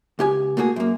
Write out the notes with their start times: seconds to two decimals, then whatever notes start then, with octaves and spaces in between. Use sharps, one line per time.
0.19 C#2 G4 G#5
0.57 A3 A#3 F#4 G#4
0.76 F#2 A#3